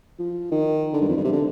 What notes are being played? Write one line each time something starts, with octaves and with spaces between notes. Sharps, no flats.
F3
D#3
D3
G2
F2
G2
C3
D3